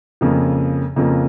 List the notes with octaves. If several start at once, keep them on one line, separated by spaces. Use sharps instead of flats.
F2 C#3 F3 A#3
F2 C#3 F3 A#3